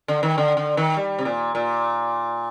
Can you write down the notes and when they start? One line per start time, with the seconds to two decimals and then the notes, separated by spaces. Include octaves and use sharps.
0.08 D3
0.23 D#3
0.38 D3
0.57 D3
0.77 D#3
0.97 G3
1.19 C3
1.25 A#2
1.55 A#2